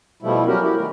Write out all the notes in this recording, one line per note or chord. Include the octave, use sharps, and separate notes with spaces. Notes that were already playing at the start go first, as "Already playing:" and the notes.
B2 F3 G3 A3 E4
F#3 G3 C#4 F#4 G4 A#4
E4 F#4 G4
D#3 A3 A#4